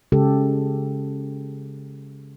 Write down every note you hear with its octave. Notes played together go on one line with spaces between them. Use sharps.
C#3 G#3 G4 A4